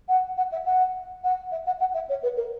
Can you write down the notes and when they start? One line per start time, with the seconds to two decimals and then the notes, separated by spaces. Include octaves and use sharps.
0.08 F#5
0.37 F#5
0.51 E5
0.65 F#5
1.23 F#5
1.51 E5
1.66 F#5
1.80 F#5
1.94 E5
2.09 C#5
2.23 B4
2.36 A#4